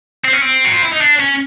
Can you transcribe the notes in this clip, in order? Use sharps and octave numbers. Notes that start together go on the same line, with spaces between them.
C4
C#4
C4
F#4
F4
E4
D#4
D4
C#4